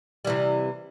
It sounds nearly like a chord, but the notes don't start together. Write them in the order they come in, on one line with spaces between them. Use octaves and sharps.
G3 E3 C3